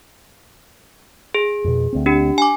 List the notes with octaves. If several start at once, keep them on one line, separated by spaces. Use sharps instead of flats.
G#4
F2 B2
D2 C4
D4 G4
G#5 D6